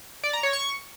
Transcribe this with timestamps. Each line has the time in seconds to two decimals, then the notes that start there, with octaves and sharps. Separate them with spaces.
0.24 D5
0.33 A#5
0.43 C#5
0.53 C#6